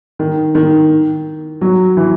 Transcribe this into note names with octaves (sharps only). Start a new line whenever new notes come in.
D#3
D#3
F#3
E3